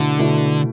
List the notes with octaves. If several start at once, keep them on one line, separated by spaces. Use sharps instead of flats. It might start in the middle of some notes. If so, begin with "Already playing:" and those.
Already playing: B2 D3 A3 E4
B2 A3 E4